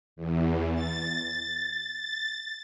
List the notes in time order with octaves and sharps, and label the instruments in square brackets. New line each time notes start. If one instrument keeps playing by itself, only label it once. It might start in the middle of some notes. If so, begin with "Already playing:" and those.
[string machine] E2
A6